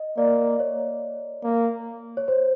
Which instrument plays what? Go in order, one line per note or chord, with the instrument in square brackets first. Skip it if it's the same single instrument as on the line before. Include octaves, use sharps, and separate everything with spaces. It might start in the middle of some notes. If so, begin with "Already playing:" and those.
Already playing: [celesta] D#5
[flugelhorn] A#3 [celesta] D5
[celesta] C#5
[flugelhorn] A#3
[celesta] C#5
C5